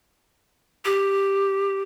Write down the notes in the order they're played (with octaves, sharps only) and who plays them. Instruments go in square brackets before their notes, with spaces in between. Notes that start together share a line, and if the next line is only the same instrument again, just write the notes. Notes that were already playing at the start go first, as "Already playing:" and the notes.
[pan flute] G4